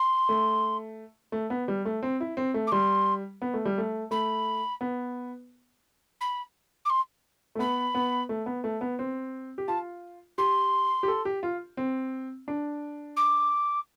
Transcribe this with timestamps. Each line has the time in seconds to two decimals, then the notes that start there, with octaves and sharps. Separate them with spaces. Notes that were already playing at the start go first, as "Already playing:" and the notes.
Already playing: C6
0.29 A3
1.32 A3
1.50 B3
1.68 G3
1.85 A3
2.03 C4
2.20 E4
2.37 C4
2.54 A3
2.67 D6
2.72 G3 C6
3.42 B3
3.54 A3
3.65 G3
3.78 A3
4.11 A3 B5
4.81 B3
6.21 B5
6.85 D6
6.90 C6
7.55 A3
7.59 B3 B5
7.95 B3
8.29 A3
8.46 B3
8.64 A3
8.81 B3
8.99 C4
9.58 G4
9.68 F4 A5
10.38 G4 C6
11.03 G4
11.08 A4
11.25 G4
11.43 F4
11.77 C4
12.48 D4
13.17 D6